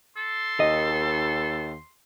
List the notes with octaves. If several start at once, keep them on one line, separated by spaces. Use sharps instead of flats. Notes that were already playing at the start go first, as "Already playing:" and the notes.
A4 C6
D#2 D#5